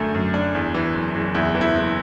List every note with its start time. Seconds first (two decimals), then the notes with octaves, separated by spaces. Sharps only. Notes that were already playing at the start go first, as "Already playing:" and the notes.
Already playing: F#2 D3 A3
0.14 F#2
0.34 D4
0.55 E2
0.74 E3
0.95 F#1
1.15 F#1
1.34 E2 E4
1.55 E3
1.61 E4
1.74 F#1